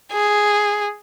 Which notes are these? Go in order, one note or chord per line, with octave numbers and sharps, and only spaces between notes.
G#4